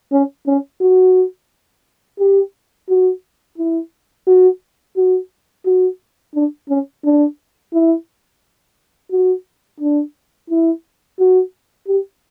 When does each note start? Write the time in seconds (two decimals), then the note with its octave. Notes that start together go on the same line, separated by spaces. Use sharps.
0.12 C#4
0.47 C#4
0.81 F#4
2.19 G4
2.89 F#4
3.58 E4
4.27 F#4
4.96 F#4
5.66 F#4
6.35 D4
6.69 C#4
7.04 D4
7.73 E4
9.11 F#4
9.80 D4
10.50 E4
11.19 F#4
11.88 G4